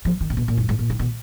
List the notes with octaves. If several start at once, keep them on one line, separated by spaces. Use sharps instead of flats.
F3
D#3
A#2
B2
A#2
F#2
G#2
A#2
D#3
B2